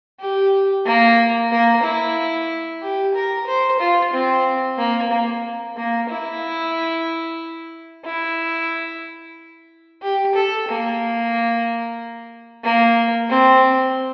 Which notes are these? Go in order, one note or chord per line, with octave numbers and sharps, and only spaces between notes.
G4
A#3
A#3
E4
G4
A#4
C5
F4
C4
A#3
A#3
A#3
E4
E4
G4
A4
A#3
A#3
C4